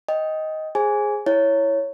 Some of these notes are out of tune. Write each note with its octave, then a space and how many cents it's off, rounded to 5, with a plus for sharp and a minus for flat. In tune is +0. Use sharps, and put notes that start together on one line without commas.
D#5 +10 G5 +0
G#4 +0 C5 +25 G#5 +0
E4 +0 C#5 +0